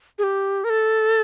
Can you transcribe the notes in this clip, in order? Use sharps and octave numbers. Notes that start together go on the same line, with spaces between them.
G#4
G4
A#4
A4